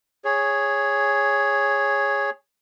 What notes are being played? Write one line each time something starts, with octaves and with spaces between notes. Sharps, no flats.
G#4 C#5